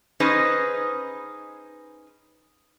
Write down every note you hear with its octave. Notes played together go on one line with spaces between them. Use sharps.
C#4 D#4 G#4 B4 C5 D#5